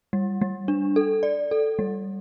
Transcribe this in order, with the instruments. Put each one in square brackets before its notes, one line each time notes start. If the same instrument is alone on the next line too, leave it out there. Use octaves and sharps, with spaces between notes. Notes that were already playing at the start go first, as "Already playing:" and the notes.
[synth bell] G3
G3
D4
A4
D5
A4
G3